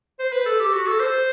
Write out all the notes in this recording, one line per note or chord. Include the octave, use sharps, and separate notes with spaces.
C5
B4
A4
G4
F#4
A4
C5